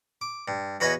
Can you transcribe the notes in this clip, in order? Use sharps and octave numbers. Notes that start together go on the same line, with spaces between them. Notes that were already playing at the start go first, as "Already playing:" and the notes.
D6
G2
E2 F#4 B4 C#5 D#5 G#5